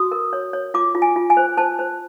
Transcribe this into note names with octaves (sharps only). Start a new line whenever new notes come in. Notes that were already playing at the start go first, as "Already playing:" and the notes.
Already playing: F#4 D#6
A#4
C#5
C#5
F4 D6
F4
G#5
F4
G#5
C5
C5 A5
C5